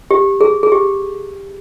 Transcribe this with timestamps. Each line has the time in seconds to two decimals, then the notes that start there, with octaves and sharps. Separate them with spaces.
0.11 G4
0.41 G#4
0.63 G#4
0.72 G4